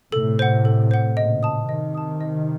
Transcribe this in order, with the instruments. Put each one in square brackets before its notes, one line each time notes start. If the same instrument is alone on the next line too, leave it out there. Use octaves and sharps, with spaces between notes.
[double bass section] A2 C3 [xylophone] A4
[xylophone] C5 F#5
A4
C5 F#5
[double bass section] A#2 C#3 [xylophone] D#5
[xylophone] A5 D#6
[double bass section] C3 D#3 [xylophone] D#5
[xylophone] A5 D#6
D#5